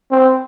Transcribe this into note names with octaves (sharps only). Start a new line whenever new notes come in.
C4